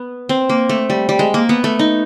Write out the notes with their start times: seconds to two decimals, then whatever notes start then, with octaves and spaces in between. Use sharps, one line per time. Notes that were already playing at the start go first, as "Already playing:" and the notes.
Already playing: B3
0.29 C4
0.49 A#3
0.69 A3
0.90 G3
1.09 G3
1.19 G#3
1.34 A#3
1.49 B3
1.64 A3
1.79 D#4